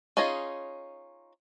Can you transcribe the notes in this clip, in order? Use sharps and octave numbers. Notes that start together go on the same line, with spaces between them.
C#4 D#4 F4 G#4 D#5